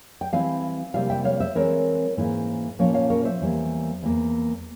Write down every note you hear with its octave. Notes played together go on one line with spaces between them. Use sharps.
G5
E3 G3 C4 E4 F5 G#5
C3 G3 A#3 E4 F5 G#5
E5 G5
C#5 F5
C5 E5
E3 G#3 C4 A#4 C#5
G#2 E3 A#3 C#4 E4
A#2 F3 A#3 C#4 A#4 C#5
C#5 F5
A#4 C#5
C5 E5
E2 E3 G3 A#3
E2 E3 A#3